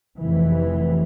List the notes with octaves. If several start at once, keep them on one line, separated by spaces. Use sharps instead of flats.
F1 F2 E3